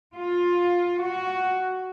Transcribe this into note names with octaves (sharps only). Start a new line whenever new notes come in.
F4
F#4